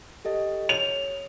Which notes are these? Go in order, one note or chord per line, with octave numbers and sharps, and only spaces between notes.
G4 A4 D#5
C#5 F7